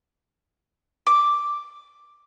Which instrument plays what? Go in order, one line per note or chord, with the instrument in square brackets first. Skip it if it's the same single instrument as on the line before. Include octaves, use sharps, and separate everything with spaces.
[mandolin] D6